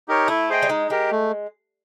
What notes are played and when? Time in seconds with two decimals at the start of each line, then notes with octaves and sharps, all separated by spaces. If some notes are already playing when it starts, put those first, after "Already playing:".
0.08 D#4 G4 A#4 C#5
0.28 A3 E4
0.50 G#4 C5 D#5 G5
0.62 G3
0.69 G#3 D#4
0.90 G#3 G4 A#4
1.11 A3